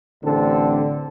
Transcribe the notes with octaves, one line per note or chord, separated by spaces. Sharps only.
A1 D3 C4 A4